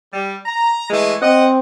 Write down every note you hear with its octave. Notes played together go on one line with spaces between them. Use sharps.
G3
A#5
E3 G#3 A3
C4 D#5 F#5